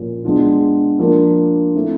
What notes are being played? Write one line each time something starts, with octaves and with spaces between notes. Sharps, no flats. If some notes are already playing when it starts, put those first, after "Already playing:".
Already playing: A#2 F3 A#3 C#4
G#3 B3 D4 F4
F3 A#3 D4
A3 C4 E4